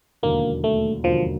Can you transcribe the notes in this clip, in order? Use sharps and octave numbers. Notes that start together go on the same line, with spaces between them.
E1 D#2 D3 F#3 A#3
A3
E1 D#2 D3 F3 F#3